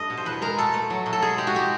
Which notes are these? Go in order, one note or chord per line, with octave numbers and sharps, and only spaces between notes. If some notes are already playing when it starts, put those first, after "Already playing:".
Already playing: G2 A3 A4 D#5
B2
C5
E2 B4
G#3 A#4
B2 A4
A3
F#3
B2
A4
G#3 G#4
G#3 G4
F#4
G#3 G4